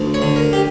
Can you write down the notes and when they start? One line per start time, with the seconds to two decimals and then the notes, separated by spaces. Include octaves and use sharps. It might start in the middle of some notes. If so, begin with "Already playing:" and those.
Already playing: D2
0.14 C#5
0.22 D3
0.36 A#4
0.53 G4